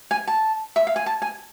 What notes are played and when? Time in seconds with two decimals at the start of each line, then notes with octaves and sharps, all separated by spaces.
0.11 G#5
0.27 A5
0.76 E5
0.87 F5
0.96 G#5
1.06 A5
1.22 G#5